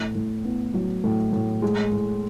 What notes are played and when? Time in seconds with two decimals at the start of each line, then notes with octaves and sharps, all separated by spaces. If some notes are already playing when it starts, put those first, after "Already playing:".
Already playing: A2
0.15 A2
0.45 B3
0.74 F#3
1.04 A2
1.33 A2
1.62 G#3
1.92 A2